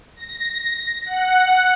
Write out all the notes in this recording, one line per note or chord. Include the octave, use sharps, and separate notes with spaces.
A#6
F#5